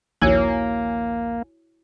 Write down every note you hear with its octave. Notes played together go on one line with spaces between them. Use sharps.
A#1 D#2 A#3 E4 F#4 C#5 G#5